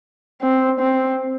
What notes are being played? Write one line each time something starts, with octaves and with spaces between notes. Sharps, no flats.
C4
C4